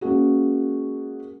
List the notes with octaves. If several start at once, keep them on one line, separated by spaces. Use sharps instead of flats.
G#3 A#3 C#4 F#4 G#4